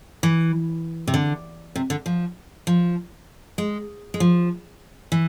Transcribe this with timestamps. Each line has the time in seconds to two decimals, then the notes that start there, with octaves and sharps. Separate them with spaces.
0.23 E3
1.07 C3
1.14 D3
1.76 C3
1.90 D3
2.06 F3
2.67 F3
3.58 G#3
4.14 G#3
4.20 F3
5.12 E3